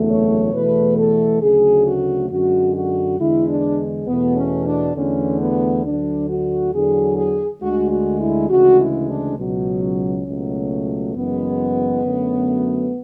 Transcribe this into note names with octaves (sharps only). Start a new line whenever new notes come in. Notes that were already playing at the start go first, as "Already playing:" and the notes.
Already playing: F#1 E2 D3 F#3 A3
C#5
E2 B2 A3 B4
A4
D2 C#3 F#3 A3 G#4
F#4
F#2 D3 G#3 F#4
F#4
E2 D3 G#3 E4
D4
E2 B2 A3 B3
C#4
D4
E2 D3 A3 C#4
B3
D2 D3 F#3 D4
F#4
E2 D3 F#3 G#4
G#4
D2 D3 G#3 F#4
F#4
E4
D2 C#3 E3 G#3 F#4
E4
D4
C#2 B2 F#3
C#4
C#2 B2 F#3 A3
F#1 F#2 E3 G#3 B3
F#2 D3 F#3 A3